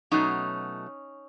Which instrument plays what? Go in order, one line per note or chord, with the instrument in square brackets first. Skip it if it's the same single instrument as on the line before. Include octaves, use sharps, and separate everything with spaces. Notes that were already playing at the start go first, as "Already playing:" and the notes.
[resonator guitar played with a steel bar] B2 F#3 A3 C#4 D#4